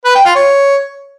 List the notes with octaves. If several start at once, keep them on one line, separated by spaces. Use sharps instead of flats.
B4
G5
F4
C#5